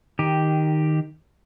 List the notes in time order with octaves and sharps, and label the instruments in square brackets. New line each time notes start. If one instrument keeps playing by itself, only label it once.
[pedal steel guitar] D#3 G4